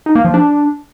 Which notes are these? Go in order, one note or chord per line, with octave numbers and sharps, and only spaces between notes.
D#4
A#3
F3
D4